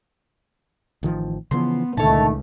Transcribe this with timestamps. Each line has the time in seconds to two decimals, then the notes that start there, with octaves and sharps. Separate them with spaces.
1.03 A1 D#3 F3
1.51 C#3 E3 F3 B3 C6
1.97 C#2 A#2 D3 D#3 A3 C#5 A5